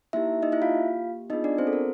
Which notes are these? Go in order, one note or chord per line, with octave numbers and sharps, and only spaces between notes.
A#3 D#4 E4 G4 E5
D#4 D#5
E4 E5
F4 F5
B3 D4 D#4 F4 G#4 D#5
D4 D5
C4 C5
A4
A#4